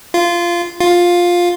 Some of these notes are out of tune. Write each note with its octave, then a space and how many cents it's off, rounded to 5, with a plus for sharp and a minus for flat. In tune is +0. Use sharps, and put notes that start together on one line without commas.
F4 -15
F4 +10